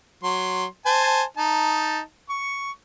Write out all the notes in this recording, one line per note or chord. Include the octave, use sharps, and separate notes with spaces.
F#3 C6
C5 G#5 A5
D#4 A5
C#6